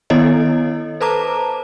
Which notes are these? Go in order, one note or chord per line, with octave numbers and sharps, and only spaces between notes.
D#3 B3 E4 A4 C#5 D#5
A4 B4 C5 A5 A#5 D6